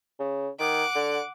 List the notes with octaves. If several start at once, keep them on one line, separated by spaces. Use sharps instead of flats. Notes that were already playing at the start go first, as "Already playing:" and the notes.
C#3
D#3 F#5 D6
D3